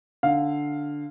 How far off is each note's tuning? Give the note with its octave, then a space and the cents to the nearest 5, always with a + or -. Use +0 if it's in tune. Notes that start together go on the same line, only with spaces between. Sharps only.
D3 +0 F5 +0